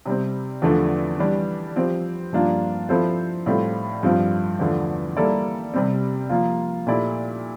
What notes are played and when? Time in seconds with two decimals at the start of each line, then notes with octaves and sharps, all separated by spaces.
0.06 C3 G3 C4
0.62 E2 D3 F3 A3 D4
1.19 E3 G3 D4 G4
1.76 F3 C4 G4 C5
2.33 G2 F3 A#3 D4 F4
2.89 F3 C4 E4 A4 C5
3.46 A2 G3 C4 F4 A4
4.03 G2 F3 C4 F4
4.59 E2 D3 F3 A3
5.17 G3 A#3 E4 A4 D5
5.74 C3 G3 C4
6.30 F3 A#3 F4
6.87 A#2 A3 E4 G4 D5